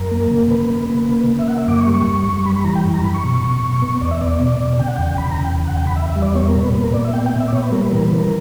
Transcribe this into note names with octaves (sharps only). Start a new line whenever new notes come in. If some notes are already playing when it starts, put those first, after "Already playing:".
Already playing: F#2 A#4
A#3
C#3
C#3 B4
A#3
A#3
C#3
C#3
E5
A#3 F#5
E5
F#2 D6
C#6
G3
C#6
F#2
F#2
G3 B5
B5
E3 A#5
G5
F#2
A#5
F#2 B5
C#6
B2
B2
B2
B3
E2 D5
E5
B3 D5
B2
B2
C#3 G5
F#5
E2 G5
E2 B5
A#5
C#3
G5
E2
F#5
E2 G5
B5
E2 E5
E5
G3
D5
B3 C#5
A#4
A#2
B4
A#2 B4
A#4
A#2 D5
E5
B3 G5
G5
B3
E5
D5
A#2 C#5
B4
G3 A#4
B4
E3 A#4
B4
C#3
A#4